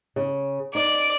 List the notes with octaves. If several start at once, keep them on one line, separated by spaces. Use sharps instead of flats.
C#3
D#4 D5